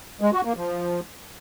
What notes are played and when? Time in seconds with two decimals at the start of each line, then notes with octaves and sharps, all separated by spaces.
0.21 G#3
0.33 F#4
0.45 A#3
0.57 F3